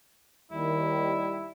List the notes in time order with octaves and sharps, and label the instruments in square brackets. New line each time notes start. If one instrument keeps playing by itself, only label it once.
[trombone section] D#2 D#3 [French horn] G3 [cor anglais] E4